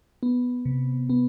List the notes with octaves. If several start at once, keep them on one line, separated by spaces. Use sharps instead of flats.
B3
C3
B3